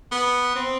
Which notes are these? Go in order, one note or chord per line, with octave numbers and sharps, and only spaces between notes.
B3
C4